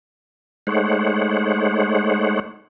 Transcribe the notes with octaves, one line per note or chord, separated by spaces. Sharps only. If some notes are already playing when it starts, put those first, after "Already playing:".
G#3 A3 D#4 C5 C#5 F#5